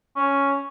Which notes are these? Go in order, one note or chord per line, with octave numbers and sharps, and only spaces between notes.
C#4